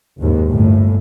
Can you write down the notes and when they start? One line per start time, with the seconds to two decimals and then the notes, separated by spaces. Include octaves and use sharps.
0.19 F#1 D#2 G#2
0.48 G1 A2